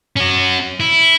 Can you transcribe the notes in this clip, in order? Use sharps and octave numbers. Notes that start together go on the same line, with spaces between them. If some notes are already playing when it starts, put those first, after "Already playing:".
C#4 F#4
E4